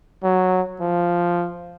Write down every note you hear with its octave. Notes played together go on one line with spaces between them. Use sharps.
F#3
F3